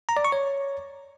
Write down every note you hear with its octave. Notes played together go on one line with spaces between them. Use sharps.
A#5
D5
C#6
C#5